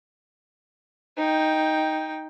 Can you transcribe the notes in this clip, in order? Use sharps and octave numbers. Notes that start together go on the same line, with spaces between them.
D#4 G5